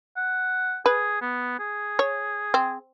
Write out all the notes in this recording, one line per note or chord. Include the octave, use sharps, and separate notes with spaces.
F#5
G#4 B4
B3
G#4
C#5
C4